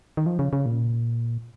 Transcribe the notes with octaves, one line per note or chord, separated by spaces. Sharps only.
D#3
F3
C#3
C#3
A#2